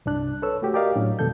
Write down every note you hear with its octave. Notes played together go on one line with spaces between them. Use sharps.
C2 G2 D4 F#6
A4 B4 C#5 E6
A3 F#4 G4 C#5
G4 A#4 D5 D#5 F5
A2 F#3 C#4 D4
F2 B2 D#3 G3 A4 G6